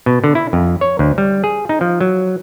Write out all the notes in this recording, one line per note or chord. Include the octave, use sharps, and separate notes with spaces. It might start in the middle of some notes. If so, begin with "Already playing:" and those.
B2
D3
E4
F2
C#5
D2
G3
G#4
D#4
F3
F#3